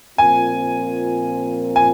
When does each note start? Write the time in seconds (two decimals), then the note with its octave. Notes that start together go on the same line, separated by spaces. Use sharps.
0.18 A#2 F3 C4 F4 A#4 G#5
1.76 G#5